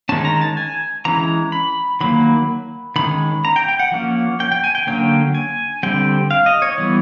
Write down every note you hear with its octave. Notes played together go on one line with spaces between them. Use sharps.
D#3 G#3 C#4 A5
A#5
A5
G#5
E3 G#3 C#4 A#5
B5
D#3 F#3 A#3 B5
D#3 G#3 C#4 B5
A#5
G5
G5
F#5
F3 A#3 C#4
G5
G5
G#5
G5
D3 F#3 A#3 C#4 G5
G#5
D3 G3 C4 G5
F5
D#5
C#5
E3 G3 B3